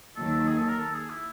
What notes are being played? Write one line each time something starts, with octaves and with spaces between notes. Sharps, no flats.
D#2 D#3 F#3 A#3 A4
G#4
A4
A#4
A4
G#4
E4